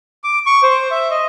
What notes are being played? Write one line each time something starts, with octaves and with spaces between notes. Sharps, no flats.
D6
C#6
C5
E5
D#5